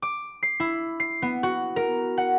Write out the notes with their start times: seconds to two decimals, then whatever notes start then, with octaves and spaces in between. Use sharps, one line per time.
0.02 D6
0.43 C7
0.60 E4
1.00 C7
1.22 B3
1.43 F#4
1.76 A#4
2.18 F#5